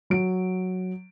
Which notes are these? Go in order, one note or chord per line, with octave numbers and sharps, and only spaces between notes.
F#3 D7